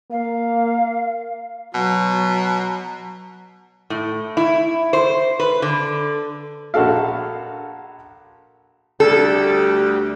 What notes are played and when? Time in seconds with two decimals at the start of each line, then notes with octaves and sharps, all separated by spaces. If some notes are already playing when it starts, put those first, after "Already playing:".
0.11 A#3 F5
1.74 B2 F#3
3.90 A2
4.37 E4
4.93 C5
5.39 B4
5.62 D3
6.74 A#1 F#4 A4 F5
9.00 D2 G3 A4